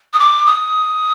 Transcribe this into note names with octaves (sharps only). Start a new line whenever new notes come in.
D#6
D6
D#6